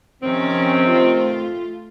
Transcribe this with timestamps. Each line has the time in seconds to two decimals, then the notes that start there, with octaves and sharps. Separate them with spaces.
0.21 C3 D#3 F3 C4 C#4
0.91 A3 F4